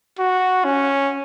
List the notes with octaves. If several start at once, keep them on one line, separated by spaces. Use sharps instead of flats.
F#4
C#4